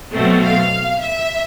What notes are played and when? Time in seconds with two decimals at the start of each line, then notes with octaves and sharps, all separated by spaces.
0.13 B2 F#3 A3 C4
0.42 F5
0.99 E5